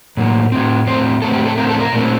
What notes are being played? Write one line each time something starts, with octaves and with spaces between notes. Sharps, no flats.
A2 F#3 A#3
A2 A3 C4
A2 A3 C4 C5
A2 A3 C4 A4
G4
A4
A2 A3 C4 A#4
A4
A#4
A#2 A3 C4